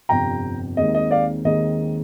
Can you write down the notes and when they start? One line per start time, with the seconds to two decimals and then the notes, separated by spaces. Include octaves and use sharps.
0.09 G1 F2 C3 G5 A#5
0.77 D#2 D#3 G#3 C4 D#5
0.95 D#5
1.11 D5 F5
1.45 D#2 D#3 G#3 C4 D#5